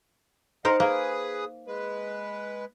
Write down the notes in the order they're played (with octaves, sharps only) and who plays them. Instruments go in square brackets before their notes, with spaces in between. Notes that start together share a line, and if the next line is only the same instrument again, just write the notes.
[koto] D#4 A#4 C5 [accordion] D#5 F5 F#5
[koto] A#3 [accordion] G#4 B4 D#6
[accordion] G#3 B4